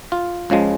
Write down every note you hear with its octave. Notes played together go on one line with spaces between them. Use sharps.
F4
C#2 C#3 F3 G#3